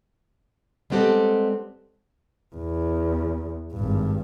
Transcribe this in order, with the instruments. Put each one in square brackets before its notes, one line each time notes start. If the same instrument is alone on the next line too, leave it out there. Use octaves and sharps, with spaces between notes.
[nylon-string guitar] G3 G#3 B3 C4 G4 A4
[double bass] E2
G#1 G2